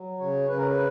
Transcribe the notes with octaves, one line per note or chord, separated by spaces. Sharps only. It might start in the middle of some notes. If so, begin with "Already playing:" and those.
Already playing: F#3
C#3 C#5
C#3 B4
A#4
B4